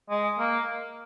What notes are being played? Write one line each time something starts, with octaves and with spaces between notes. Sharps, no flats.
G#3
A#3